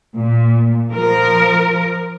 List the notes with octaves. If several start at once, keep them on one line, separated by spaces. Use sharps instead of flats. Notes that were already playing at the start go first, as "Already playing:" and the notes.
A#2
F3 A#4